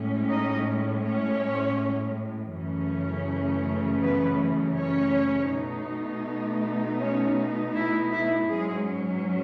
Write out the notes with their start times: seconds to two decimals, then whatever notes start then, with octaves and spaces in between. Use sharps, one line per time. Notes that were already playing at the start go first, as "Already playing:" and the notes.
Already playing: A2 G#3 C#4
0.29 D#4 D#5
1.03 C#4 C#5
2.52 F#2 C#3 E3 A3 C#4
4.02 B3 B4
4.76 C#4 C#5
5.50 B2 A3 D#4
6.99 C#4 C#5
7.74 E4 E5
8.11 E4 E5
8.49 G#2 F#3 G#3 C#4 G#4